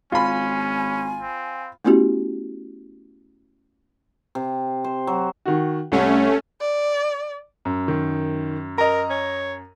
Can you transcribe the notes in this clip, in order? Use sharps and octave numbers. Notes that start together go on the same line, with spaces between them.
G#1 C#4 F4 G#5 B5
C4
A3 B3 C#4 E4 F#4 G4
C3
C5
F#3
D#3 F#4
C2 A3 C#4
D5
F#2
D#3
A#4 D#5 A#5
C#5